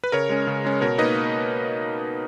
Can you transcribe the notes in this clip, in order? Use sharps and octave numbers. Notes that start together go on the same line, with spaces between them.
B4
C#3 A#4 C#5
G#3 C#4
C#3
G#3 C#4
B2 A#4 C#5
A#3 D#4 B4 D#5